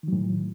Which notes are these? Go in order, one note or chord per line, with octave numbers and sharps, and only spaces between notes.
A2 D#3 F#3